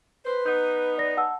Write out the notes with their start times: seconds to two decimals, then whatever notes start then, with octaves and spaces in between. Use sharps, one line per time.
0.25 B4 C5
0.46 B3 D#4 G6
0.98 D5 A#6
1.17 F#5 A5 E6